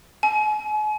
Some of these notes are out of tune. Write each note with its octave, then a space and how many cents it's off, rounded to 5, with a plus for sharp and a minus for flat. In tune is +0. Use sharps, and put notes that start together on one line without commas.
G#5 +40